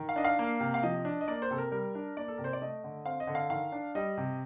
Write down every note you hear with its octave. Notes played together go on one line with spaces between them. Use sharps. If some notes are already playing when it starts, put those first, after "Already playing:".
Already playing: D#3
F5
D4 D#5
F5
A#3
C3
F5
F3 D#5
D4
D#5
A#3 D5
C5
C3 A4
A#4
G3 A#4
D4
A#3 D5
A4
C3 A#4
C5
D5
A3 D#5
D3
C4 F5
D#5
D3
F5
D#3 F5
D4
G3 D#5
C3